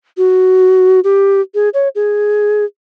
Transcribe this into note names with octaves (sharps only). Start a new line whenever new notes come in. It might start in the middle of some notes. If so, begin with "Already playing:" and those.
F#4
G4
G#4
C#5
G#4